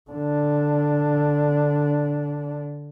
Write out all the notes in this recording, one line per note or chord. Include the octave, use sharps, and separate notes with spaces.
D3 D4